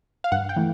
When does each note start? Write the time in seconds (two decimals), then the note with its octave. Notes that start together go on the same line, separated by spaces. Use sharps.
0.24 F5
0.32 G2 F#5
0.49 G5
0.56 E3 A3